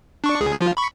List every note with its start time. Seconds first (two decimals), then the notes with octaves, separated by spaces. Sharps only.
0.24 D4 C#6
0.41 C#2 G#4
0.61 F3 F4
0.77 B5 C#6